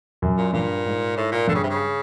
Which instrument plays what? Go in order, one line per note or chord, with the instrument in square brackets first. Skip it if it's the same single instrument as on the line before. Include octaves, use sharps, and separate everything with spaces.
[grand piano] F#2
[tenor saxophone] A#2
[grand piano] G2 [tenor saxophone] A#2
[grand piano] G#2
[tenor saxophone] A2
A#2
[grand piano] G2 [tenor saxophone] D3
[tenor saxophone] C#3
C3
C#3